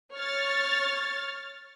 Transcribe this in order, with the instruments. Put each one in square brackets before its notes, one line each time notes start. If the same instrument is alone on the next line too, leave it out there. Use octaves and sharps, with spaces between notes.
[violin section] C#5 F6 A6